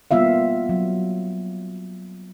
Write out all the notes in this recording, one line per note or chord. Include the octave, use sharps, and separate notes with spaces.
G3 A#3 B3 F4 E5 F5
F#3